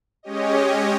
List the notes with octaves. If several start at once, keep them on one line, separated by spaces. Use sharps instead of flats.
G#3 C#4 G4 C#5 D#5